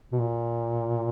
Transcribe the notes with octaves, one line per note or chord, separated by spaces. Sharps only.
B2
A#2